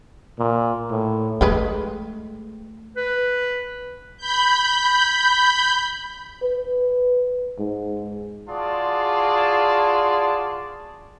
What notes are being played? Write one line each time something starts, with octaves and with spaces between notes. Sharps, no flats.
A#2
A2
G#3 A3 B4 G5
B4
B5 G6
B4
G#2
F4 F#4 G#4 D5 A5 C6